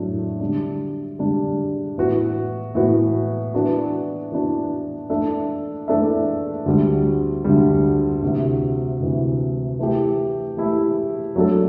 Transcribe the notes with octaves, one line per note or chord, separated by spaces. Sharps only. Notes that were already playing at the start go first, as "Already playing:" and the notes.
Already playing: A2 F#3 A3 D4
D3 G3 D4
D3 G3 D4
A2 E3 B3 F#4
A2 E3 B3 F#4
E3 B3 D4 F#4
E3 B3 D4 F#4
E3 A3 D4 A4 E5
E3 A3 D4 A4 E5
D2 D3 G3
D2 D3 G3
D2 C3 E3
D2 C3 E3
E3 A3 E4 G4
E3 A3 E4 G4
F#3 A3 D4 A4